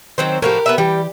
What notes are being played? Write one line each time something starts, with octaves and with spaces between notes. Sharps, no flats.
D#3 F#3 C4 C5
A2 F3 F#4 G4 A#4
B3 B4 E5
E3 G3 G4 G5